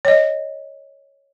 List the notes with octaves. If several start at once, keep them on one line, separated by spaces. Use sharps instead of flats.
C#5 D#5